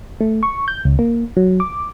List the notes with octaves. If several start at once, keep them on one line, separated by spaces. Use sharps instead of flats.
A3
C#6
G6
C#2
A#3
F#3
D6